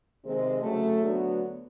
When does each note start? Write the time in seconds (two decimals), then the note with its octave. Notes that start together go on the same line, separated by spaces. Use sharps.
0.23 C3 D#3 G#3 C4
0.61 C#3 F#3 A3
1.00 D2 D3 F#3 B3